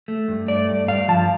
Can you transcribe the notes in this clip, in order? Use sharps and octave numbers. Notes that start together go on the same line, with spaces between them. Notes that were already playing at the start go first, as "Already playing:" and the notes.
A3
G2
A3 D5
G2
G2 F5
F3 A5